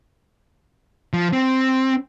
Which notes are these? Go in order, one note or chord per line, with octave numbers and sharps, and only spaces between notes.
F3
C4